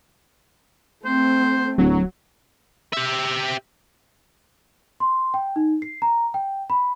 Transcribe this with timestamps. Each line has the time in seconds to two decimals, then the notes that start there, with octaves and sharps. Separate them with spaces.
1.05 A3 C4 C5
1.78 D1 F#3
2.93 G4 E5
5.00 C6
5.34 G5
5.56 D#4
5.82 C7
6.02 A#5
6.34 G5
6.70 B5